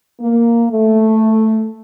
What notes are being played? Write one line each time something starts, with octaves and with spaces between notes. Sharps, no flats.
A#3
A3